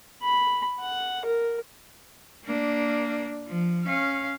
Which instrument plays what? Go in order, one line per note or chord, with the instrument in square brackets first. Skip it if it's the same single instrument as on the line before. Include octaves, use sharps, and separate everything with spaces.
[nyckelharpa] B5
F#5
A#4
[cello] A#3 D4
F3
C#4 F5